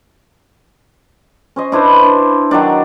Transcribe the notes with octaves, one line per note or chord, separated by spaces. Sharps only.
C#4 C5 D#5
D4 E4 B4 C5
D4
D#3 F#3 D4